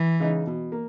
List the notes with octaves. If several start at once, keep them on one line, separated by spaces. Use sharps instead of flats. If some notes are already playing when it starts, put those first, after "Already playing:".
Already playing: E3
C#3 G#3 D#4
B2
A#3